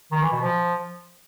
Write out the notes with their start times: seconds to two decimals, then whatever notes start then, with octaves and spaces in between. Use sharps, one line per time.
0.12 D#3
0.22 E3
0.32 B2
0.42 F3